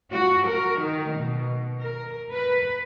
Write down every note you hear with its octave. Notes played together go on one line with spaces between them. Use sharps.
F#4
A#4
D#3
B2
A#4
B4